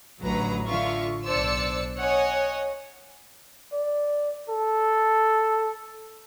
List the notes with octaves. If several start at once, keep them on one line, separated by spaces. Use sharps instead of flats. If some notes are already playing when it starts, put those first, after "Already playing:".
A1 D2 F#3 B4 A#5
D3 F4 E5 F5 C#6
B1 D4 C5 D5 E6 C#7
C#5 D#5 F#5 G#5
D5
A4